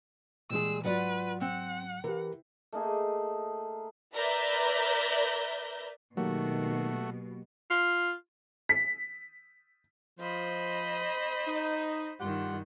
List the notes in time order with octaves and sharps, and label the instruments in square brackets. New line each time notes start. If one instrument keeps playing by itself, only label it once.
[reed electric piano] A#2 E3 [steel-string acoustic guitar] G3 G#3 G#4 [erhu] E6
[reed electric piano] G#2 F#3 [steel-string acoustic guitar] F4 D5 F#5 [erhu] B4
[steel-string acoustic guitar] C4 [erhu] F#5
[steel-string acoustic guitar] E3 [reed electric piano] G4 A#4
[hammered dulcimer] A3 A#3 D#4 G#4
[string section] A#4 B4 D5 E5 G6
[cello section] B2 [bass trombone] D#3 [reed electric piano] F#3 A#3 G4 [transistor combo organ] A3 F#4
[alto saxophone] F4
[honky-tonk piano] B6
[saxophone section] F3 [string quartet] C5 D#5 B5
[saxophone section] D#4
[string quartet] G2 D#3 [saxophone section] F4 G4 F#5